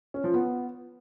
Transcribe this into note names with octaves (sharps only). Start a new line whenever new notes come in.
C#4
F3
B3